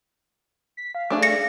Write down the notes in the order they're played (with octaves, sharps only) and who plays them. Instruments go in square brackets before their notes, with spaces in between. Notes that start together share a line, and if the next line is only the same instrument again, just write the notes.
[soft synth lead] B6
F5
[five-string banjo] A3 D4 G#4
[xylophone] A#6 C#7